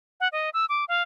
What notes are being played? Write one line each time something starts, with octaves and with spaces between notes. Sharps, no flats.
F#5
D#5
E6
D6
F5